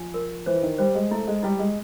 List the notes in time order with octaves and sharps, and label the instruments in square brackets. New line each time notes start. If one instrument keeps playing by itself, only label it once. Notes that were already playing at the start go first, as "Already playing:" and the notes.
Already playing: [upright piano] F3 [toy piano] G#5
[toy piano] A#4
[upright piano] E3 [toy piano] C5
[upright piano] D#3
[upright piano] G3 [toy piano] C5
[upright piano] G#3
[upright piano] A3 [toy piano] E4
[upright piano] G#3
[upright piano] G3 [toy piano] E4
[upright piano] G#3